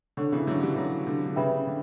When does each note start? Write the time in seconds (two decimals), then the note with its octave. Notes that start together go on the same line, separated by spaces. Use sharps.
0.17 D3 D4 A4 C#5 F#5 C#6
0.32 C#3 E3
0.47 D3 F#3
0.61 E3 G3
0.76 D3 F#3
1.07 D3
1.26 D3
1.36 C#3 B4 E5 G5 B5
1.67 D3